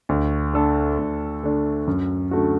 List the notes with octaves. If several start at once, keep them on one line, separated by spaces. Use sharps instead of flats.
D2
D3 A3 D4 A4
D2
D3 A3 D4 A4
F#2
D3 A3 F#4